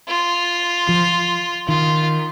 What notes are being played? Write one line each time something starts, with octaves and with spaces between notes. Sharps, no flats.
F4
F3
D#3 F4